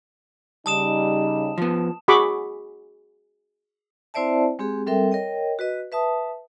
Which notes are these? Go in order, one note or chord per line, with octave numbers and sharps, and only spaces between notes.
C#3 G3 D#4 A5 D#6 E7
F3 B3
F#4 G#4 B5 C#6 D6
C4 E4 C5 D5 E5 A5
G#3 C4 G4 G#4
G3 C4 A4 A#4 E5 G5
A#4 C#5 D#5 G5
F#4 B4 D#5
B4 E5 A5 D#6